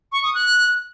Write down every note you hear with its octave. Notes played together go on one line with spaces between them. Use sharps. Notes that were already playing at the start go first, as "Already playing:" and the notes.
C#6
D#6
F#6